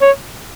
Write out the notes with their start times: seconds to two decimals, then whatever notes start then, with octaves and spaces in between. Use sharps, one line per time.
0.01 C#5